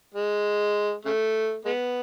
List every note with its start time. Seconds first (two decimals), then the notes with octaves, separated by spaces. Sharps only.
0.14 G#3
1.05 C#3 A3
1.65 G#3 B3